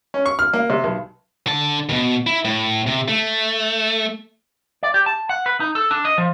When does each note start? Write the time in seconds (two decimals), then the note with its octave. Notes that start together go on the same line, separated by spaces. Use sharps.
0.14 C#4
0.26 C#6
0.39 F6
0.54 A#3
0.70 C3
0.84 B1
1.47 D3 A5
1.89 D#2 B2
2.27 E4
2.45 A2
2.87 C3
3.08 A3
4.83 D5
4.94 G4
5.06 A5
5.29 F#5
5.46 B4
5.60 D#4
5.75 A4
5.91 D4
6.05 D#5
6.18 F3